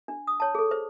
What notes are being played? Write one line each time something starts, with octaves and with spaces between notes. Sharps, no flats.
D4
D#6
C#5 A5
G#4 A4
C5